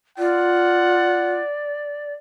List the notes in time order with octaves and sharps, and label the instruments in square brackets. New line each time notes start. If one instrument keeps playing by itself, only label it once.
[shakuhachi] F4 [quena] D5 [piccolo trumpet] F#5